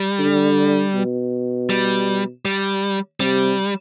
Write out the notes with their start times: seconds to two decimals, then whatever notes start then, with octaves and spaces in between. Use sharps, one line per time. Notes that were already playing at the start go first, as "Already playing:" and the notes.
Already playing: G3
0.19 D3
0.95 B2
1.70 G3
2.45 G3
3.20 C3 G3